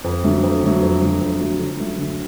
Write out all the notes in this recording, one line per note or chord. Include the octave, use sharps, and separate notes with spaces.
F2
D3 F#3 A3
F2
D3 F#3 A3
F2
D3 F#3 A3
F2
D3 F#3 A3
D3
F#3 A3 C#4
D3